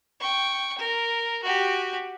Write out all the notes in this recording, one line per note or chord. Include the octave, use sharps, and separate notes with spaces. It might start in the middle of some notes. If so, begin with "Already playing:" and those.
G5 C#6
A#4
F#4 G4